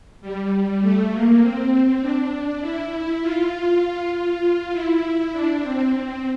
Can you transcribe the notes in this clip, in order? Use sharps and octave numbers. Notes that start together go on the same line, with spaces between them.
G3
A3
A#3
C4
D4
E4
E4
F4
F4
E4
D4
C4